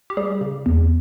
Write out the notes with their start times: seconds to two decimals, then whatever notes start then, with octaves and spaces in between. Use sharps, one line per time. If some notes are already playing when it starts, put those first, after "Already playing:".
0.10 G4
0.17 G3 G#4
0.41 C#3
0.66 E2